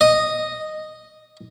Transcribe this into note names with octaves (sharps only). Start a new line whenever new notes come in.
D#5